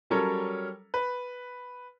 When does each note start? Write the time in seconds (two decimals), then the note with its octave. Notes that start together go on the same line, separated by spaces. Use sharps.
0.10 F#3 G3 C#4 A4 A#4 C#5
0.94 B4